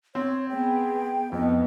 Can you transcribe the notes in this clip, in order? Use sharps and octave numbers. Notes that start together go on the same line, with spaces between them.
C4 C#5
B3 G#4 G5
F2 B3 D#4 D#5